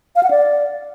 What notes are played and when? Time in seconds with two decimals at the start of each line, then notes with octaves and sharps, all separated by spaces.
0.16 F5
0.23 F#5
0.31 D5